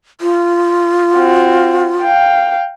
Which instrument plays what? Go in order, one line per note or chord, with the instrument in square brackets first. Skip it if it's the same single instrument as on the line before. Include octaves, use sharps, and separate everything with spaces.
[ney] F4
[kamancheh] C4 F#4
F5 G5